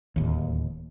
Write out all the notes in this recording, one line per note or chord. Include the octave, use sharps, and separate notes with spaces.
D1 D#2